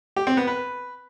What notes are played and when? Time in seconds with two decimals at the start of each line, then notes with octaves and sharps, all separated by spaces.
0.16 G4
0.27 C4
0.37 B3
0.47 B4